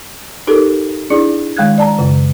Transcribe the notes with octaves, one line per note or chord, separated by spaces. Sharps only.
D#4 G4 A4 A#4
D4 E4 G#4 D5
D#3 G#3 F5 F#6 G#6
D5 A5 A#5
F#2 C#3